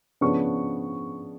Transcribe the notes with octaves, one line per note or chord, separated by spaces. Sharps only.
C#3 F3 B3 D4 C#6